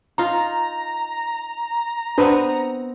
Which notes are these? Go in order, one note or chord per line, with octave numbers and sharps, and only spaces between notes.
D#4 F4 A#5
B3 C4 D4 B4 D#5 B5